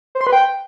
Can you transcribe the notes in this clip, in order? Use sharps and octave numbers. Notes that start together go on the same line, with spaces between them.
C5
C6
B4
G5